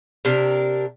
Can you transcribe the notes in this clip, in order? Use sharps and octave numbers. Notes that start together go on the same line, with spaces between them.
C3 D4 A#4